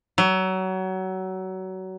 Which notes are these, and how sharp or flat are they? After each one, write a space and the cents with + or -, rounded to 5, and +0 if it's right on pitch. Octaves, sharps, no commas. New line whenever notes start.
F#3 +25